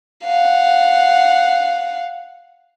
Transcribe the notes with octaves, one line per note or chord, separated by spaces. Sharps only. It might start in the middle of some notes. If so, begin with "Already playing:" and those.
F5 F#5